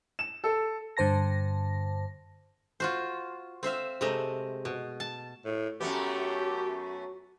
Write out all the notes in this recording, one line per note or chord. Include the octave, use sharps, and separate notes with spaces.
E7
A4
G2 D3 C5 A5 A#6
F4 F#4 C5
C4 C5 E5 F5
C3 G#3 A3 D#5 A#5
B2
A5
A2
F#2 A3 B3 F#4 G4